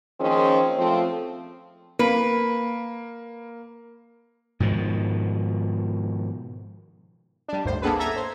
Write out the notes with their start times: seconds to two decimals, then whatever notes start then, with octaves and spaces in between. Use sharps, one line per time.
0.21 D#3 F3 A#3 C4 C#4 G#4
0.77 F3 A3 C4
1.99 A#3 B4
4.60 G#2 B2 D#3 F3
7.48 G3 D4
7.65 G#1 D#2 A2 C5
7.82 A#3 B3 D4 G#4 A4 B4
7.99 A4 E5 A#5 G#6
8.16 C5